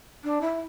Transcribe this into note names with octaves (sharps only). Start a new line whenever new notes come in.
D4
E4